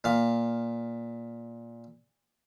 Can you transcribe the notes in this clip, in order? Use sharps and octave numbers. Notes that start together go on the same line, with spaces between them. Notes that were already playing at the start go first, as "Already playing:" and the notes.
A#2 F5